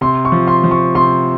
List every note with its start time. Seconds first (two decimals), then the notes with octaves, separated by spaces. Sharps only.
0.01 C3 C6
0.25 C#6
0.32 F3
0.48 C6
0.64 F3
0.71 C#6
0.95 C3 C6